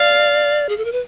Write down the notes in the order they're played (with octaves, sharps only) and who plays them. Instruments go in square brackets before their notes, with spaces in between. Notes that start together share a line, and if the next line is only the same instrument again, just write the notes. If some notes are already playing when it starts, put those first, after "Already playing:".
Already playing: [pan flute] D5 [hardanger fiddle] F5
[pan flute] G#4
A4
A#4
B4